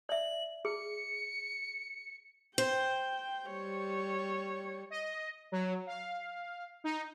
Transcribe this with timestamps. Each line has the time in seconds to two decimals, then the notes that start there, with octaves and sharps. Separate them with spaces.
0.09 D5 E5 F#7
0.65 G#4 C#7
2.58 C5 G5
3.49 G3 C#5
4.90 D#5
5.52 F#3
5.87 F5
6.84 D#4